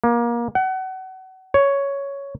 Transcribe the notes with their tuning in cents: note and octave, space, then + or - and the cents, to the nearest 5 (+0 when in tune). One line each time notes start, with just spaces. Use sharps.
A#3 +25
F#5 +30
C#5 +5